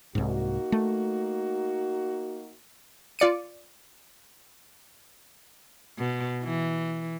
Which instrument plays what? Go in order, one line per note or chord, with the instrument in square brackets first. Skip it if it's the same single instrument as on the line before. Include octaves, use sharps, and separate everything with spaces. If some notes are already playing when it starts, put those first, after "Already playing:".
[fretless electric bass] C2 G#2 [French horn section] A#3 D#4 F#4
[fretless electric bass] A3
[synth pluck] F4 D5 C#7 D#7
[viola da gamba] B2
E3